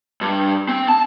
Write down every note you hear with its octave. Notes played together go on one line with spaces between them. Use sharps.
G2
C4
A5